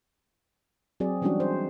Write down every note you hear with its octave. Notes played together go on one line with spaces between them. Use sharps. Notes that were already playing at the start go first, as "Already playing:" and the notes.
F#3 C4 G#4 D5
E3 G3 G#3 C#4 D4 F#4
C5